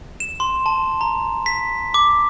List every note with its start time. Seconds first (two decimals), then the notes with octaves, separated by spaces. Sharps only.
0.20 E7
0.40 C6
0.66 A5
1.01 A#5
1.46 B6
1.94 D6